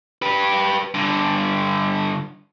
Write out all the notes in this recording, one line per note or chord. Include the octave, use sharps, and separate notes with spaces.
G4 B4
G2 D3